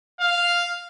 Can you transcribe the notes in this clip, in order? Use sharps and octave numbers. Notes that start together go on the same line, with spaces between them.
F5